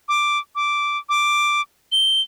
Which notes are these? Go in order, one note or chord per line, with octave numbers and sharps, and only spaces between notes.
D6
D6
D6
G7